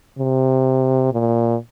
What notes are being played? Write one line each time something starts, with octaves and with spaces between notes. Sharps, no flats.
C3
A#2